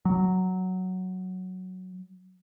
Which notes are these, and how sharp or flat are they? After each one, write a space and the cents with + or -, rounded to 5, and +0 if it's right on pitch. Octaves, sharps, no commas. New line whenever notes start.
F#3 +0